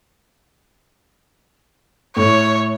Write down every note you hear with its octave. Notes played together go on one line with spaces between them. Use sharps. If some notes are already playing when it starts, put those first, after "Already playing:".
A2 C#5